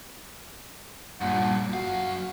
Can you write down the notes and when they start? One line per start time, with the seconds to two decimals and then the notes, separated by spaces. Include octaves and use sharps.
1.21 G2 A#2 F#5
1.73 F#2 F#4 F5